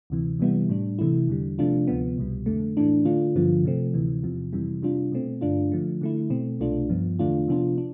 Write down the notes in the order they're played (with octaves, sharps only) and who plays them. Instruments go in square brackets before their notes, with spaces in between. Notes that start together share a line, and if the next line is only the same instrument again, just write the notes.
[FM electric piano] D2 C3 E3
C3 E3 G3 B3 E4
A2 G3 D4
C3 E3 A3 E4
E2 D3 G3
C3 F3 A3 D4 F4
D2 C3 F3 B3
C2 B2 G3
F2 D3 A3
A2 E3 A3 D4
D3 A3 D4 F4
G2 D3 F3 B3 F4
C3 F3 A3 C4
D2 C3 E3
E2 C3 F3
F2 C3 E3 G3
C3 G3 D4 F4
B2 A3 C4
G2 D3 A3 D4 F4
D3 F3 A3
D3 A3 E4
B2 A3 C4
C2 B2 A3 D4 F4
G2 F3 B3
E2 D3 A3 D4 F4
C3 F3 B3 D4 F4
D4